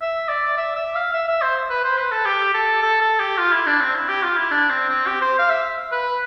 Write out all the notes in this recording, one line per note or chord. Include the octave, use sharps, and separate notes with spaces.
E5
D5
E5
E5
F5
E5
E5
C5
B4
C5
B4
A4
G4
A4
A4
A4
G4
F4
E4
D4
C4
E4
G4
F4
E4
D4
C4
C4
G4
C5
F5
E5
B4